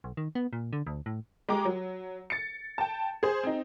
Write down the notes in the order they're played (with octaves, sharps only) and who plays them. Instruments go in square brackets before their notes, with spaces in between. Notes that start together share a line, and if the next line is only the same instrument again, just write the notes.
[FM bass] B1
D#3
B3
A#2
D3
D2
A2
[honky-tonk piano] G#3 G4 A#5 D6
F#3
A6 C#7
G5 A5
G#4 C5
C4 D#4